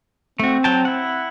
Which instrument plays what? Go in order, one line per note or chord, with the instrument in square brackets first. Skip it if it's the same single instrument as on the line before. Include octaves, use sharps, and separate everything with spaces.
[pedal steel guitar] A3 F#4 [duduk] C4
[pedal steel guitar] F#3 G5 A5
E4 F#5